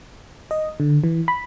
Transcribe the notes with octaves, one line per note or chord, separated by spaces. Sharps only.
D#5
D3
E3
B5